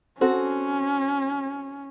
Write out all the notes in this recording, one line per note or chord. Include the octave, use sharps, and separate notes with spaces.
C4 C#4 F#4 A4